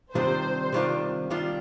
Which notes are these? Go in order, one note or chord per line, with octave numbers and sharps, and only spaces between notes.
C3 D#3 G3 D4 F4 C5
C3 D#3 G3 D4 F4
C3 D#3 G3 D4 F4